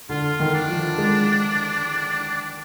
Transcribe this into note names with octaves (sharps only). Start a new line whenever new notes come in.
D3 F4
D#3
D4
F3
G#3